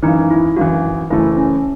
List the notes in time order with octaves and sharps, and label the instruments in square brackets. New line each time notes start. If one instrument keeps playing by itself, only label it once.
[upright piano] G#1 F#2 E3 [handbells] D#4
[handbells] E4
[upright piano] G#1 F#2 E3 [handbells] F#4
[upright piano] F#1 F#2 E3 A3 [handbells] E4
[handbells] C#4